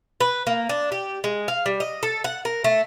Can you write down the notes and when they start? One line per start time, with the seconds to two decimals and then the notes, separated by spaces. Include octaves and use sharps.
0.20 B4
0.47 A#3
0.69 D4
0.92 G4
1.24 G#3
1.48 F5
1.66 G3
1.80 D#5
2.03 A4
2.24 F#5
2.45 A#4
2.64 A3